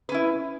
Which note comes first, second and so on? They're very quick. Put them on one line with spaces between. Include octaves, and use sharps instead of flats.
B4 C#4 E4